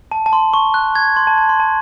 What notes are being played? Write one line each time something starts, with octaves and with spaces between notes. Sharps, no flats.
A5
A5
C6
C#6
F#6
G#6
C6
A5
A5
C6
A5